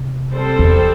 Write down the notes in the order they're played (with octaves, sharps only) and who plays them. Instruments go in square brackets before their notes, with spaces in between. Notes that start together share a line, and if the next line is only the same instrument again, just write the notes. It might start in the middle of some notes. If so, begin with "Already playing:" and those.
Already playing: [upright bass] C3
[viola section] G3 C4 A4 C5
[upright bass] E2